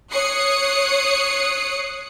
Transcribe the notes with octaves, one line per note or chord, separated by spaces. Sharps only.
C#5 D#6 F#6 C7 C#7